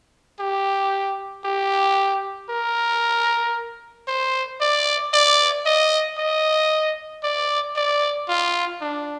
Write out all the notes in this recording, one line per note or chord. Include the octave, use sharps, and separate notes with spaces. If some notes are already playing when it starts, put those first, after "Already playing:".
G4
G4
A#4
C5
D5
D5
D#5
D#5
D5
D5
F4
D4